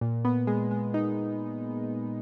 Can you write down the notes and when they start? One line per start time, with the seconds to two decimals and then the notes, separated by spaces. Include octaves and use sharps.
0.01 A#2
0.25 B3
0.47 G#3
0.71 G#3
0.94 D#4